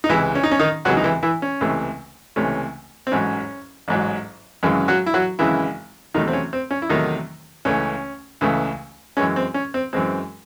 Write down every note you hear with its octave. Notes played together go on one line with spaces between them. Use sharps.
D#4
C#2 C3 E3 G#3 E4
C#4
D#4
C#4
D#3 D#4
C#2 C3 E3 F#3 G#3 F#4
D#4
E3 E4
E3 E4
C#4
C#2 C3 E3 A3
C#2 C3 E3 A3 C#4
C4
A1 G#2 F#3 C#4
A1 G#2 F#3
G#1 F#2 C#3 E3 G#3
F#3 F#4
E4
F#3 F#4
G#1 F#2 C#3 E3 G#3 E4
E2 C3 D#3 F#3 A3 D#4
C4
C#4
C4
C#4
E4
E2 C3 D#3 F#3 A3 D#4
C#2 C#3 E3 A3 C#4
C#2 C#3 E3 A3
F#2 E3 G#3 C#4
C4
C#4
C4
F#2 E3 G#3 C4